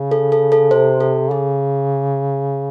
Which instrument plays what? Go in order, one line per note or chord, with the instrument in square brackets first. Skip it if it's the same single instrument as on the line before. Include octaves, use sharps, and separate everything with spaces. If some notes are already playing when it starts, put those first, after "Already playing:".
Already playing: [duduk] C#3
[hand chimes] A4
A4
A4
[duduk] C3 [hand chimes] C5
[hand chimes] A4
[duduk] C#3 [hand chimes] G#4